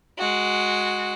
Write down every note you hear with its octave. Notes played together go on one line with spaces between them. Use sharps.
G#3 F#4